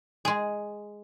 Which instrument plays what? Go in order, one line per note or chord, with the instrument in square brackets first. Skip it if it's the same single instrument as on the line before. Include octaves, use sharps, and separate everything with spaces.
[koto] G#3 G#4